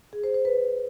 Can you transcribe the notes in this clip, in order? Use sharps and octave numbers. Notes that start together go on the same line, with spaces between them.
G#4
C5
C5
B4